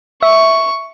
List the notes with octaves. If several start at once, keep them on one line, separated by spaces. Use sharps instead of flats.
E5 C#6